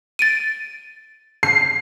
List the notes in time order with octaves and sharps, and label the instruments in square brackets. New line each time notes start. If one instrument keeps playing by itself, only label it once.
[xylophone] A6 D7 D#7
[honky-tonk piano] C7